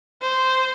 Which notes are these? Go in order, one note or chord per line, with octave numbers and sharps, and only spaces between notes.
C5